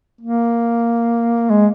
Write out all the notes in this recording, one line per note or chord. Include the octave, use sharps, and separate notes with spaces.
A#3
G#3